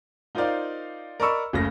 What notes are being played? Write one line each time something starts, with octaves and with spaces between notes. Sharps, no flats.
D#4 F4 A#4 C5 D5 F5
A#4 D5 D#5 B5 C#6 E6
F#1 C#3 A3 A#6